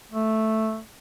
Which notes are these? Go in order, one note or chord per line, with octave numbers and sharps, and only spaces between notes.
A3